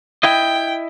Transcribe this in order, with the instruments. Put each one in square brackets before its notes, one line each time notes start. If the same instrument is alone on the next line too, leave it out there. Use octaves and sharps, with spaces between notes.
[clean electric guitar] E4 D#5 [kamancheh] G5